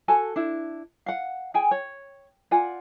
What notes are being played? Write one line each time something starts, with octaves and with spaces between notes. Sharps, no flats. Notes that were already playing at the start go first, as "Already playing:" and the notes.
F#4 A4 G#5 A5
D4 E4
F5 F#5
G#4 G5 G#5
C#5
F4 D5 F#5 G#5